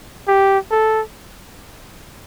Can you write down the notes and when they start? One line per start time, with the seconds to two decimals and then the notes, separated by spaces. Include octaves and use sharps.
0.27 G4
0.71 A4